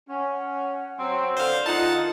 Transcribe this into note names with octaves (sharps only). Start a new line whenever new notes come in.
C#4 F#5
F#3 C4
D3 C5 F5
D3 A#3 D#4 F4 F#5 A5